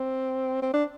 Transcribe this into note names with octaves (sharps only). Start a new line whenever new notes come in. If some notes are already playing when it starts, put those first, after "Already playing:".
Already playing: C4
C4
D4